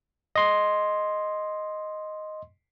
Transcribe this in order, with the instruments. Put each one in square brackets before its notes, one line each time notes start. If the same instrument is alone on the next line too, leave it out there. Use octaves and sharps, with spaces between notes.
[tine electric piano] D#5 C6